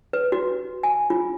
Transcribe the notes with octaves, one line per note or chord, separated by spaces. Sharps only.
B4
F#4
G#5
F4